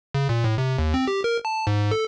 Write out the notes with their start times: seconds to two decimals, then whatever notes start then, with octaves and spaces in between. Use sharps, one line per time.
0.15 C#3
0.29 A#2
0.44 A2
0.58 C3
0.78 D#2
0.94 C4
1.08 G4
1.24 A#4
1.45 A5
1.67 G#2
1.91 A4